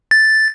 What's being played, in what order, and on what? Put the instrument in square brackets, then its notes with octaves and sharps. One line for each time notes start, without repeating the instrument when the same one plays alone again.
[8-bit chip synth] A6